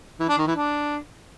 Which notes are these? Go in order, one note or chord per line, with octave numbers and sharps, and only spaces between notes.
E3
D4
D#3
E3
D4